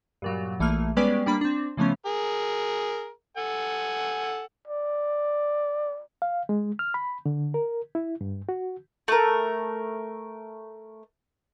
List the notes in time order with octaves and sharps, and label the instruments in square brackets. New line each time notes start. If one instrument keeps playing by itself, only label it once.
[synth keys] G2 A#2 F#3
A#1 E3 A3 A#3 F6
G3 G#3 B3 C#4 B4 D5
G3 A#3 D4 B5
C4 D4
C#3 E3 F3 A3 B3 C#4
[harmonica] G#4 A#4
A4 F#5 G#5
[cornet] D5
[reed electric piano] F5
G#3
F6
B5
D3
A#4
E4
G2
F#4
[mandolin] A3 A#4